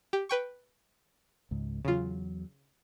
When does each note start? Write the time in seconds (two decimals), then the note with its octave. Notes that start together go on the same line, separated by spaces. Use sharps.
0.13 G4
0.29 B4 G5 C#6
1.51 C#2 G#2
1.85 E2 C#3 F#3 F4